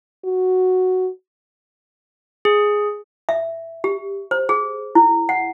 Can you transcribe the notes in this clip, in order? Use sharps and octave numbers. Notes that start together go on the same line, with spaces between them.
F#4
G#4
E5
G4
C5
G#4
E4
F#5